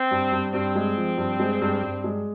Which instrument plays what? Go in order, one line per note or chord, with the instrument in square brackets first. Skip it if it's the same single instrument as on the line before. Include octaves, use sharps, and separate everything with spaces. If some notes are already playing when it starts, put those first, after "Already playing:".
Already playing: [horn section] C4
[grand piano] G2
G2
[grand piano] G2 [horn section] C4
[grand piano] G#3
F3
G2
G#3
G2
G2
G#3